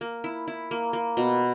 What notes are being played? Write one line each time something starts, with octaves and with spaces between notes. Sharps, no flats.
A#3
E4
E4
A#3
A#3
B2